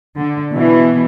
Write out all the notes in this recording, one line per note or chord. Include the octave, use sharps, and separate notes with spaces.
D3
B2 E3